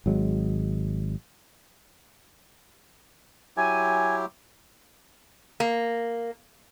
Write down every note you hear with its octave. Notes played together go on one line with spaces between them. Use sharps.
G#1 F#3 G#3
F#3 E4 G4 G#5
A#3